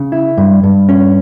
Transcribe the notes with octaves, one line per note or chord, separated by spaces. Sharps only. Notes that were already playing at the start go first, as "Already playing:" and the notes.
Already playing: C#3
E4
G2
G2
C#4